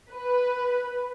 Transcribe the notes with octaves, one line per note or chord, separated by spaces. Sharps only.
B4